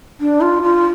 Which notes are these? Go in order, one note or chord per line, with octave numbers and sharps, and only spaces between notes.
D4
F4
F4